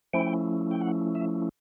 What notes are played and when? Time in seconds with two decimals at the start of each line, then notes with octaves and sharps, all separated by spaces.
0.13 F3 A3 C#4 E4 G5
0.71 G5
0.81 F#5
1.15 E5